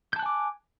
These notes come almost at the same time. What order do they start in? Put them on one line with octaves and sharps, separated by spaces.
G6 A5 F#6 G#5 D6